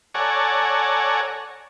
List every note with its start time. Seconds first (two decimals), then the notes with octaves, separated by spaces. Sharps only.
0.14 A4 C#5 D5 F#5 G#5 A#5